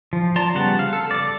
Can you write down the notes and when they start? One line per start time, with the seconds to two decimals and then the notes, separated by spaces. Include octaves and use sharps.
0.13 F3
0.36 D5 A5 A#5 C6
0.55 C#3 G3 B3 F#5 A5
0.79 F5
0.93 A4
1.11 D5 D6